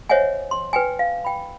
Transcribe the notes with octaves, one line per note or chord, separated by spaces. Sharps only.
C5 C#5 D#5 E5 F#5 G#5
C6
B4 G5 G#5
F5
G5 B5